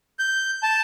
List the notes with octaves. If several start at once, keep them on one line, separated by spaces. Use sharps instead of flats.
G6
A5